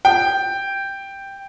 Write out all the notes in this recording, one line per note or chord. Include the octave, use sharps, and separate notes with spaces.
G5